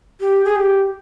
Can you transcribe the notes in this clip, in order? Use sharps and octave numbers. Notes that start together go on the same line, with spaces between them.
G4
G#4
G4